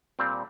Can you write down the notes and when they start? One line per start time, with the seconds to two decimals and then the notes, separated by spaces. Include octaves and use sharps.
0.19 A#2 G3 C4